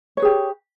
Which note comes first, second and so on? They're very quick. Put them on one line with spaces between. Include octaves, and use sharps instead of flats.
C#5 B4 G#4 G4